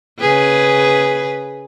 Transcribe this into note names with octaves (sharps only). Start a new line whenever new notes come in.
C#3 G#4 B4